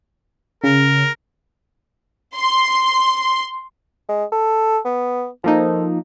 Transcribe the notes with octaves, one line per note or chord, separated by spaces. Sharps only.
C#3 A#4
C6
G#3
A4
B3
F3 A#3 D#4 A4